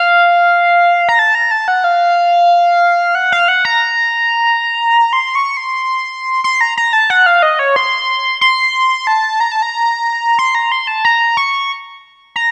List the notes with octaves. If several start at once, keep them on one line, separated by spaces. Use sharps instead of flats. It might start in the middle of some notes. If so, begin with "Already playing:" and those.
Already playing: F5
A#5
A5
A#5
A5
F#5
F5
F#5
F5
F#5
A#5
C6
C#6
C6
C6
A#5
A#5
A5
F#5
F5
D#5
C#5
C6
C6
A5
A#5
A5
A#5
C6
A#5
C6
A5
A#5
C#6
A#5